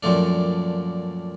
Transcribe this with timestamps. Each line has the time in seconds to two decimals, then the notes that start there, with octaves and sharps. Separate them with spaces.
0.03 F#2 A#2 F3 A3 D4